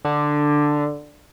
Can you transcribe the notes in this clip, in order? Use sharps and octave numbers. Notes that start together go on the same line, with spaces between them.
D3